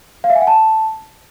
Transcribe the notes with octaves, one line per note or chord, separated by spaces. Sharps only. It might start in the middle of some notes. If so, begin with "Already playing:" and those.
F5
E5
G#5
F#5
A5